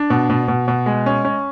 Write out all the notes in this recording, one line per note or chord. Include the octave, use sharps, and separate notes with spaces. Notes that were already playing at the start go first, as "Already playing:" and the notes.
Already playing: D4
B2
B2
B2
B2
G#3
C#4
C#4